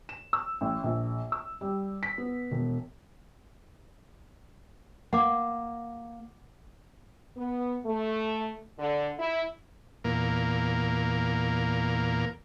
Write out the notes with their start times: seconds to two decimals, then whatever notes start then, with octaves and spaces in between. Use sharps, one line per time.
0.09 E7
0.33 E6
0.61 A1
0.84 A#1
1.32 E6
1.61 G3
2.03 B6
2.18 B3
2.51 E1
5.13 A#3 F#5 D6
7.36 B3
7.86 A3
8.79 D3
9.19 E4
10.04 E2 A#2 A#3